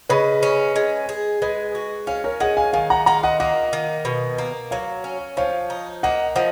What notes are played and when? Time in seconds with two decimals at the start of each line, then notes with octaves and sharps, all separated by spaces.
0.09 C#3 B4 D#5
0.43 C#4
0.76 G#3
1.09 G#4
1.42 G#3 B4 D#5
1.75 F#4
2.07 C#4 C#5 F5
2.24 A#4 C#5
2.40 G#3 D#5 F#5
2.57 F5 G#5
2.73 D#3 F5 G#5
2.90 F#5 A#5
3.06 F4 F#5 A#5
3.23 D#5 F#5
3.40 A#3 D#5 F#5
3.73 D#3
4.05 B2
4.38 A#3
4.71 F#3 C#5 F5
5.04 C#4
5.37 F3 C#5 F5
5.70 D#4
6.03 A#3 D#5 F#5
6.36 F3 D#5 F#5